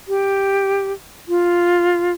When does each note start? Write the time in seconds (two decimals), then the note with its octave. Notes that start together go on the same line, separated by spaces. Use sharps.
0.08 G4
1.28 F4